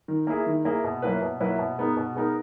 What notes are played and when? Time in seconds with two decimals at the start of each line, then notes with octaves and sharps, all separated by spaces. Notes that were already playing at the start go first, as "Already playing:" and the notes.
0.08 D#3
0.27 A#3 E4 G#4
0.46 D#3
0.65 A#3 E4 G#4
0.84 B2
1.02 F#3 A#3 E4 B4
1.21 B2
1.40 F#3 A#3 E4 B4
1.59 B2
1.78 G#3 B3 D#4 A#4
1.97 B2
2.15 G#3 B3 D#4 A#4